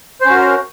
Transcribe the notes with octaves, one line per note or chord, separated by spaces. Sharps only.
C#4 F#4 A#4 C5